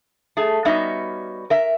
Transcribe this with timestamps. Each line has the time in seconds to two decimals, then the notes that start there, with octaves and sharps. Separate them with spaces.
0.37 A3 G#4 A5
0.65 G3 B3 C#4 D#4 F#4 E5
1.50 A#4 E5